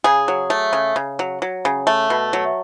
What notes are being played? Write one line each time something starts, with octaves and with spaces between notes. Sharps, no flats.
C#3 G#4
F#3
A3
C#3
C#3
F#3
F#3
C#3
A3
B2
F#3